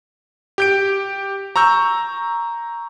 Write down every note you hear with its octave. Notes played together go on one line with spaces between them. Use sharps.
G4 G6 D7
A#5 C#6 E6 G6